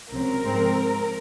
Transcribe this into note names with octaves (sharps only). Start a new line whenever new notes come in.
C#2 C3 F#3 C4 A#4
G#2 F3 G#3 C4